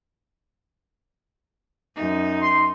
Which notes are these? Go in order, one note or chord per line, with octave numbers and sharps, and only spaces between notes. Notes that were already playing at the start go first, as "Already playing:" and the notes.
F#2 D#4
C6